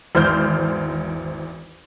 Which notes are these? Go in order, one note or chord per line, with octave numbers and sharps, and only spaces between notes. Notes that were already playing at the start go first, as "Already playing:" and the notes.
G#1 E2 C5 F6 G6